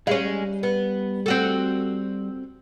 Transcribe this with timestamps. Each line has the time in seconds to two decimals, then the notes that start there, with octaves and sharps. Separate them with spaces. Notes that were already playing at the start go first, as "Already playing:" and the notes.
0.07 G3 G#3 C#4 F5
0.63 B3
1.26 C4 F#4 A4